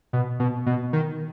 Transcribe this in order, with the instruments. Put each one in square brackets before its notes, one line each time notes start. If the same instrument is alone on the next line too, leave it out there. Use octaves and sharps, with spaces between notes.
[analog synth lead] B2
B2
B2
D#3